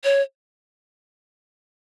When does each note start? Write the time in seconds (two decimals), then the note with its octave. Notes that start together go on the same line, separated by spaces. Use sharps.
0.04 C#5